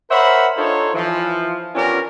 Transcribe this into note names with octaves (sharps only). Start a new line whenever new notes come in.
A#4 C5 C#5 E5 F#5 B5
D4 D#4 F4 A4 C5 C#5
E3 F3
B3 C#4 D4 F4 G4 A#4